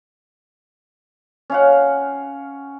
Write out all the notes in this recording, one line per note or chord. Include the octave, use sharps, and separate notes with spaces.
C#4 F5 F#5